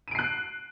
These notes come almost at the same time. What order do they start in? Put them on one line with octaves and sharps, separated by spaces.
D#7 D7 C7 F#6